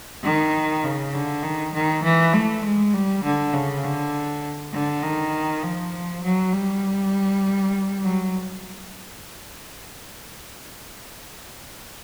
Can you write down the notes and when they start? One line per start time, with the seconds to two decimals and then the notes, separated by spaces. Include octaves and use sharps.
0.24 D#3
0.84 C#3
1.14 D3
1.43 D#3
1.74 D#3
2.03 E3
2.34 A3
2.64 G#3
2.93 G3
3.24 D3
3.53 C#3
3.84 D3
4.73 D3
5.03 D#3
5.63 F3
6.23 F#3
6.53 G3
8.03 F#3